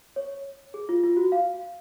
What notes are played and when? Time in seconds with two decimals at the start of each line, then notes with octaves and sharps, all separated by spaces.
0.16 C#5
0.74 G#4
0.89 F4
1.03 F4
1.17 F#4
1.32 F5